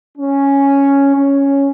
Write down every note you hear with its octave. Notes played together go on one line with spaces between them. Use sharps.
C#4
C#4